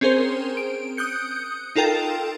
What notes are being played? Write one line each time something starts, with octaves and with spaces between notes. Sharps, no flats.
C4 C#4 G#4 A#4 C5
D7
D#6 F#6 G6 C#7
D#4 F4 A4 A#4 G5 A6